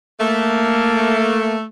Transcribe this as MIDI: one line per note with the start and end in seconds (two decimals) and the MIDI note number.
0.20 1.63 57
0.20 1.56 58